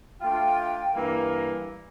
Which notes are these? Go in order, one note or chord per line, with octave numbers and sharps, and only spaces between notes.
A3 D4 F4 G5
G2 E3 A#3